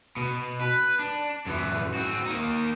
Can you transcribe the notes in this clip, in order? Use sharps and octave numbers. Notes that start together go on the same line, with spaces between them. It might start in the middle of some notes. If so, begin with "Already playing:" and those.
B2
B4
D4
F#2 E3
C4 F#4
A#3 D#4